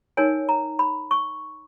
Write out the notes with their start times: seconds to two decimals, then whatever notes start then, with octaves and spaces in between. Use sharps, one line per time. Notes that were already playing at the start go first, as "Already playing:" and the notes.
0.17 D#4 A#4 C#5 G#5
0.49 A#5
0.79 B5
1.11 C#6